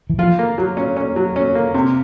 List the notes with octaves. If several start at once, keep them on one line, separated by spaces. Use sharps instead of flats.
E3
F3 F4
A#3
F#3
C#4
C#4
F#3
C#4
A#3
C3